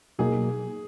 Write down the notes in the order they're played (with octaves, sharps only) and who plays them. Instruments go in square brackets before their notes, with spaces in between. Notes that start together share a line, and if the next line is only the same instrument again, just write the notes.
[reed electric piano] B2 F#3 A#3 D#4 [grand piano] G#4